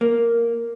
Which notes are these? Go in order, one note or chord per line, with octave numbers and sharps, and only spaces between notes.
A#3